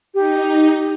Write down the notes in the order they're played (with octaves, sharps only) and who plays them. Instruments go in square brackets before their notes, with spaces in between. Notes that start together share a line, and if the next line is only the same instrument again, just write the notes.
[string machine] D#4 [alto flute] G4